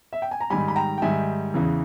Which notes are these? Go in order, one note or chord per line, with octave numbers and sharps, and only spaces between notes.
E5
G5
G#5
A#5
G#2 D#3 G3 G#5 B5
B5
G5 A#5
G5
G#2 D#3 G3 E5 G#5
E2 C#3 E3